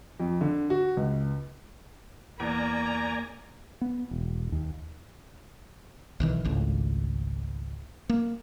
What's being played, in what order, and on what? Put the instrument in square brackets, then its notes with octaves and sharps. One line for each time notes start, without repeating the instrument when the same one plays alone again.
[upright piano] F2
D3
F#4
C#2
[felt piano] E2 [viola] A#3 [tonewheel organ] D5 G#5 [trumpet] A#5
[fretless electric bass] B3
E1
D#2
B1 D#3 E3
G#1 C#2 A2
A#3